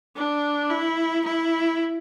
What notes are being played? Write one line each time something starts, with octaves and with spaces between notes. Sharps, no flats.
D4
E4
E4